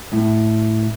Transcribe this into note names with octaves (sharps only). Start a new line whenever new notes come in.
A2